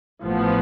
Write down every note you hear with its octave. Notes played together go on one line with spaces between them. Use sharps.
A1 A2 F3 B3